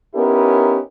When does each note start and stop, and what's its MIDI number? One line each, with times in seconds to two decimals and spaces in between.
0.15 0.79 59
0.15 0.79 61
0.15 0.79 63
0.15 0.79 64
0.15 0.79 67
0.15 0.79 70